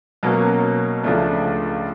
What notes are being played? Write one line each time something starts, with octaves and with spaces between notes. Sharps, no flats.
B2 F#3 A#3 C#4
C#2 C#3 F3 A3 D4